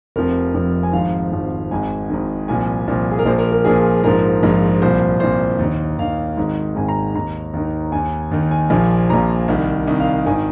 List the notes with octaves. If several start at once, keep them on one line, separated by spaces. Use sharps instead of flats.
F1 F2 C3 F3 A#4
F1 F2 C3 F3
G#5
G#1 G#2 F3 F5
G#1 G#2 F3
G#1 G#2 D#3 G#5
G#1 G#2 D#3
C2 A#2 F3 G#5
C2 A#2 F3
G#4
A#4
A#1 A#2 F3 C5
A#4
A#4
A#1 A#2 F3 G#4
A#1 G#2 F3 A#4
A#1 G#2 F3
C2 A#2 F3 C5
C2 A#2 F3 C5
D#2 D#3
D#2 D#3 F5
G#1 G#2 D#3
G#1 G#2 D#3 G#5
A#5
D#2 D#3 A#5
D#2 D#3
D#2 D#3 G#5
D#2 D#3
G#5
A#1 A#2 F3 G#5
A#1 A#2 F3 A#5
C2 C3 D#3
C2 C3 D#3
F5
G#1 D#3 G#5